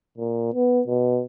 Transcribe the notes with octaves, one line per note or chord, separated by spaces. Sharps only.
A#2
B3
B2